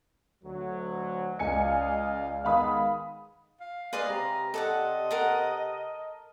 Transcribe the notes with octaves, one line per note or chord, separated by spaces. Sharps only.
D2 F#3
C#2 D5 D#5 F5 G#5 C#7
D#3 G#3 B3 F5 B5 D#6
F5
G#3 B4 D5 D#5 F5
C3 A#5
A4 D5 D#5 F#5
A4 A#4 F#5